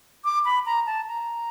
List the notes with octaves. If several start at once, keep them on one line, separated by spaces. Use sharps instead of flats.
D6
B5
A#5
A5
A#5